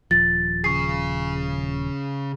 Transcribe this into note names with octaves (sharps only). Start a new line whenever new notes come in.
D#1 F3 A6
C#3 G#4 C#6 C7